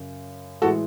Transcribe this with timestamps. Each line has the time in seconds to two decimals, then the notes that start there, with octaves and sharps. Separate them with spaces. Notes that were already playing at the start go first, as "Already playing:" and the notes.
Already playing: F#2 C#3
0.62 A2 E3 G#3 F#4 A4